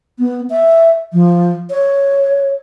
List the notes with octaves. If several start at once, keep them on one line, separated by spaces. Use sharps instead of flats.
B3
E5
F3
C#5